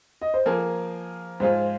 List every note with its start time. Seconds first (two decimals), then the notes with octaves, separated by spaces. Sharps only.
0.22 D#5
0.34 C5
0.46 F3 A#3 G#4 A#4
1.40 G#2 G#3 F4 G#4 C5